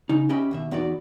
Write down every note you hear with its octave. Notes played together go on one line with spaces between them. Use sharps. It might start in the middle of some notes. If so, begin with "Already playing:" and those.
C#3 D#4
C#4 G4 D#5 E5 G5 B5
D#2 B2 E5
E2 B3 D#4 F#4 B4 D5